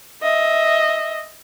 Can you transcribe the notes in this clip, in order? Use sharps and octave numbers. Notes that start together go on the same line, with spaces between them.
D#5 E5